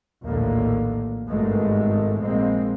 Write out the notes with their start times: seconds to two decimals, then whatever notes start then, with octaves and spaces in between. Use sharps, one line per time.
0.24 A#1 D#2 A2 D3 A#3
1.28 G#1 G2 B2 D#3 G#3 A3
2.22 A#1 G#3 A#3 C4